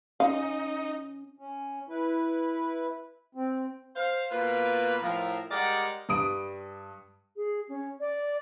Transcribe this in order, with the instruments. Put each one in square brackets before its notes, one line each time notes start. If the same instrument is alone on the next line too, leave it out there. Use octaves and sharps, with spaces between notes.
[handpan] C#4 [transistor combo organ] D#4 [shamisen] F5
[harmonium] C#4
E4 B4
C4
[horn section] C5 F5
B2 A#3 F4 B4
A2 F3 A#4
G3 G#3 A#4 D5 F#5 G5
[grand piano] G2 G3 D#6 D7
[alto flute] G#4
C#4
D5